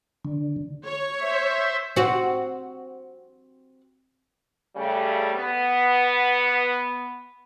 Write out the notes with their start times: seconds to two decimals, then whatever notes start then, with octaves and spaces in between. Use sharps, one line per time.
0.25 D3
0.85 C#5
1.20 C5 E5
1.96 C4 F#4
4.76 C#3 G3 A3
5.35 B3